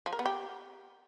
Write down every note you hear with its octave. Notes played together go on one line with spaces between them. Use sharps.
F3
A#4
B3
G4